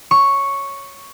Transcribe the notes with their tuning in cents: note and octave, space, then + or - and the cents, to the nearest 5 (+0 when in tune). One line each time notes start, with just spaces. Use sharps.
C#5 +0 C#6 +0